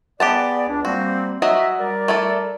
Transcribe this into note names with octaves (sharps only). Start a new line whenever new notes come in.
B3 G4 G#4 D5 F#5 A5
C#2 D4
G3 A#3 C4 F#4
F#3 F#4 D#5 E5
G3 A#4 D5
A3 E4 A4